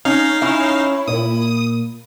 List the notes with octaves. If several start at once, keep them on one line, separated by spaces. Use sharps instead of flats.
C#4 D#4 F5 A#6
C#4 E4
A#2 D#6